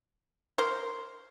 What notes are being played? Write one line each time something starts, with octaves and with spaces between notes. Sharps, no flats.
A#4 C5